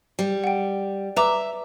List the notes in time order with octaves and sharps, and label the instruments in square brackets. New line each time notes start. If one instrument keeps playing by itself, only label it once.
[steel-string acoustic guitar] G3
[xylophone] F#5 G5
[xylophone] B4 A#5 D6 [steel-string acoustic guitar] E5